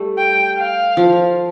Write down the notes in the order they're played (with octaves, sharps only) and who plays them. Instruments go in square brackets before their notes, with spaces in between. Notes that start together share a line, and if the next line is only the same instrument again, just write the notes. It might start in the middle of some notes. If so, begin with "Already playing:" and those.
Already playing: [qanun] G3 A3
[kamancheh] G5
F5
[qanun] F3